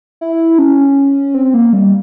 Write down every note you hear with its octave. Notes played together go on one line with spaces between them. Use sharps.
E4
C#4
C4
A#3
G3